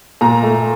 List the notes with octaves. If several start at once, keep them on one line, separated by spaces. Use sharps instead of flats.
A#2 A#5
A3